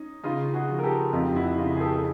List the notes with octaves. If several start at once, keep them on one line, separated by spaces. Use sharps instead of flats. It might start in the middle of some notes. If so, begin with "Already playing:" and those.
Already playing: C#4 D#4
C#3 D#4 F4
F#4 G#4
F3
A#4
G4 A4
F2 F4 G4
G4
E4 F#4
C#3 D#4 F4
G#4
G4 A4
A4